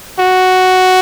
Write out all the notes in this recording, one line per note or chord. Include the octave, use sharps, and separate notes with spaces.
F#4